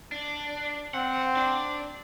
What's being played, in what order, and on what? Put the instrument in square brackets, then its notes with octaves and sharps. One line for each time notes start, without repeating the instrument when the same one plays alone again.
[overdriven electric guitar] D4
[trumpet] C4 [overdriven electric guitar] F#5
[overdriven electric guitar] D4